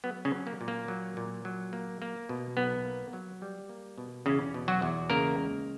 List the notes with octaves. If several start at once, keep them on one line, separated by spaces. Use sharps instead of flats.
F#3 B3
C#3 C#4
F#3
A#3
A#2
A#3
F#3
A#2
F#3
A#3
A#3
B2
B1 B3
A#3
F#3
G3
A#3
B2
E2 C#3 C#4
B2
F#3 F#4
E2
C#3 A#3 A#4
C#2